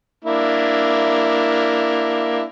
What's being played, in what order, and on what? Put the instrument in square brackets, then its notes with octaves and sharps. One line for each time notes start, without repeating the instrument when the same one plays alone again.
[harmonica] A#3 D4 E4